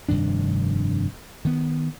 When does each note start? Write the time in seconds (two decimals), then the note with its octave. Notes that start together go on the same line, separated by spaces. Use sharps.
0.09 F1 G2 D#3 D4
1.45 D#3 B3